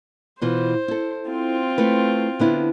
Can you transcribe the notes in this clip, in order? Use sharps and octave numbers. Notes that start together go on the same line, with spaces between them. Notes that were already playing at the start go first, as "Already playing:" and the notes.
B2 E3 F4 C5
E4 A4
C4 F4
A3 E4 B4
D3 B3 E4